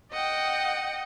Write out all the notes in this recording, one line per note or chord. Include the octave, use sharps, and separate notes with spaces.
D#5 F#5 G5